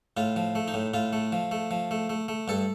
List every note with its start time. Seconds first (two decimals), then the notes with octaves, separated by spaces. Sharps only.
0.17 A2 F4
0.36 F3
0.55 A3
0.68 D#4
0.74 A2
0.94 A2 F4
1.13 A3
1.32 F3
1.52 A3
1.71 F3
1.91 A3
2.10 A3
2.28 A3
2.48 G2 A4